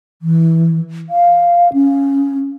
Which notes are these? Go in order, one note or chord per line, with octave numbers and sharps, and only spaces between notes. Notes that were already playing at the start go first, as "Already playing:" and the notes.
E3
F5
C#4